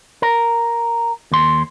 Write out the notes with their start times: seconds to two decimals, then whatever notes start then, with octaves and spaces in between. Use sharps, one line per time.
0.22 A#4
1.31 D#2 C6